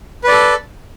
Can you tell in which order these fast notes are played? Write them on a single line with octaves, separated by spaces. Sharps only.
B4 D5 A4